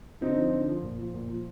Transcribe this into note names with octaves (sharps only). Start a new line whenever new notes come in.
D3 C4 D#4
F3
D3
F3
A#2
F3
A#2
F3